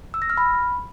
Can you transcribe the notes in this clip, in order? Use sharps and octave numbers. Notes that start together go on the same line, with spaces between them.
E6
A#6
F6
B5